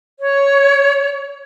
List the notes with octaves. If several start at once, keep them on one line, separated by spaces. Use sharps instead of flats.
C#5